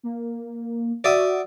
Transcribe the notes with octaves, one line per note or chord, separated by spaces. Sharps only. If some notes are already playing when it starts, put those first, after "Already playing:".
A#3
F#4 D5 E5 D#6